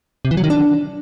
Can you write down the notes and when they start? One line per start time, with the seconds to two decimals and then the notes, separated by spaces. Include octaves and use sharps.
0.25 C3
0.31 E3
0.37 F#3
0.44 D#3
0.50 D4